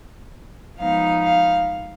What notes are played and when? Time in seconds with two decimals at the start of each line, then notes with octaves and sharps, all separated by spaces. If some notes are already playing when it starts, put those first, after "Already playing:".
0.79 F3 G#3 B3 D#4 F5
1.23 F5